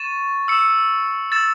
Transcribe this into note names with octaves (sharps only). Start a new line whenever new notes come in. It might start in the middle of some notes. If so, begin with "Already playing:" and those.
Already playing: C#6 A6 E7
E6 C#7 E7
E6 A6 E7